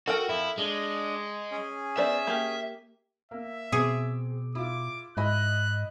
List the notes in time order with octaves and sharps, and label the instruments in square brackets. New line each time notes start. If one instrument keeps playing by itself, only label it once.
[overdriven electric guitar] F#4 [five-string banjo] A4 A#4 G5
[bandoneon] F2 F3 [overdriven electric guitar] E4
[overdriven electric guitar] G#3 [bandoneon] D4 D#5
[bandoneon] C#4 G#4
[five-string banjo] B3 C5 D5 [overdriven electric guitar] E5
[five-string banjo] A#3 G4
[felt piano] A#3 [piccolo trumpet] E5
[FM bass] B2 [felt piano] C4 C5 D6 [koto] G#4
[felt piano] E4 F4 [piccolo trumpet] D6
[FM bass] G#2 [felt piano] E4 D#5 B5 [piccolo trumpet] F#6